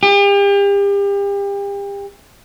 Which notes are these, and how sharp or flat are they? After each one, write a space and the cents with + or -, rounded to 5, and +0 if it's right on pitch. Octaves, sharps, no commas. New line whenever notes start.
G4 +35